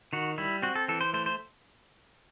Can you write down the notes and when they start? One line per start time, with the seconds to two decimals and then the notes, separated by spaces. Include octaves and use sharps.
0.13 D#3 F#4
0.38 G3 E4
0.62 C4 F#4
0.76 A4
0.88 E3 A4
1.01 C5
1.13 A3 C5
1.26 C5